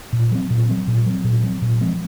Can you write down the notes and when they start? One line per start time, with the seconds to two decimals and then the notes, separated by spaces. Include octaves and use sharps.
0.13 A#2
0.31 F#3 C4
0.50 A#2
0.69 F#3 C4
0.88 A#2
1.06 F#3 C4
1.24 A#2
1.43 F#3 C4
1.62 A#2
1.81 F3 G#3 C4